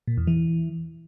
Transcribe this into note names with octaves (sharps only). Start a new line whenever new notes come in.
A#2
E2
E3